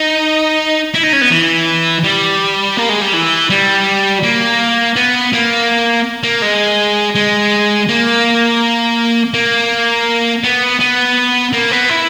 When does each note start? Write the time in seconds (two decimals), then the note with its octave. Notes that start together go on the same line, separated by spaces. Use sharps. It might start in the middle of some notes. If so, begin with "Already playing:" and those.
Already playing: D#4
0.94 E4
1.03 D#4
1.13 C#4
1.21 B3
1.31 E3
2.04 G3
2.77 A#3
2.89 G#3
3.01 G3
3.14 E3
3.50 G3
4.23 A#3
4.96 B3
5.33 A#3
6.23 A#3
6.42 G#3
7.15 G#3
7.88 A#3
9.34 A#3
10.44 B3
10.80 B3
11.53 A#3
11.71 B3
11.90 E4